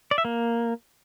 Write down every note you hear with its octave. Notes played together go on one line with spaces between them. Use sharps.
D5
E5
A#3